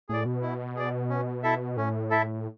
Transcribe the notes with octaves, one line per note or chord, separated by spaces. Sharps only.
A2 G#4 D5
B2
E4
G#4 D5
C#4
E4 A4 E5
A2 C#4
E4 A4 E5